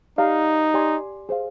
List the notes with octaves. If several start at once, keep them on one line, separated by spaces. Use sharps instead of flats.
D#4 G4 D5 F5 A#5
G4 D5 G#5 C6
G#4 C5 F5